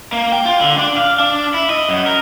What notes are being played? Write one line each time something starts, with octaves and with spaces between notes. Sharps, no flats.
A#3
G5
F4
D3
D4
F5
D4
E4
D#5
F#2
A#4